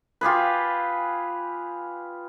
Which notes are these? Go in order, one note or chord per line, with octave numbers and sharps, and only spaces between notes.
F4 G4 G#4 B4